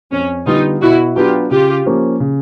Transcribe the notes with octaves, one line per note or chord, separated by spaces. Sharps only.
F2 C#4
D3 G3 B3 D#4 F4
B2 E4 F#4
F#3 B3 D4 F4 G4
C#3 F4 G4
F3 A#3 C#4
C#3